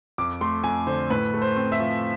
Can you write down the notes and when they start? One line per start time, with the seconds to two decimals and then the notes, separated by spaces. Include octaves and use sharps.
0.18 F2 D6
0.41 A3 C6
0.64 F2 G#5
0.87 D3 C5
1.10 A2 B4
1.34 A3
1.42 C5
1.56 C4
1.72 E5
1.80 F3